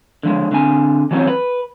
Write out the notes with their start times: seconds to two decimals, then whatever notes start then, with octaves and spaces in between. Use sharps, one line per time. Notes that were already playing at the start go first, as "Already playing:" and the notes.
0.23 D3 F3 G#3
0.52 D3 C4 G#5
1.11 E3 F#3 G3 A3 C4 C#4
1.27 B4